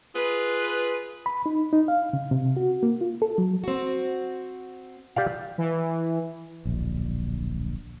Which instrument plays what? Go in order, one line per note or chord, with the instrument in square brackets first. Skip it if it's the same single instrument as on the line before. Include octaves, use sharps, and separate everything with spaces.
[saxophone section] F4 G#4 B4
[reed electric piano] B5
D#4
D#4
F5
C#3
C3
F#4
A#3
F4
A4
F#3
[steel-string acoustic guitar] C4 F#4
[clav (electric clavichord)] G4 D5 F5
[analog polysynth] E3
[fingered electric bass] D1 A#1